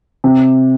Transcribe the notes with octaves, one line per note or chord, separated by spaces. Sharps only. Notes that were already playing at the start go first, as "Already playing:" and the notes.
C3